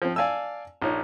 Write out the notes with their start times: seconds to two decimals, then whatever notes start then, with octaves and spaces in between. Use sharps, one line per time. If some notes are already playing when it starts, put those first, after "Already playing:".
0.02 F3 C4
0.16 D5 F5 G#5 A5 E6
0.82 A#1 D#4 C#5